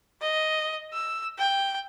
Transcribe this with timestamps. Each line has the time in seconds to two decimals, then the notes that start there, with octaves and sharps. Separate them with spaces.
0.21 D#5
0.93 E6
1.38 G5